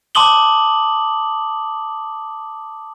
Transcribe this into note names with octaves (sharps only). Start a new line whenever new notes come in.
A5 C6 D6 D#6 F#7 G7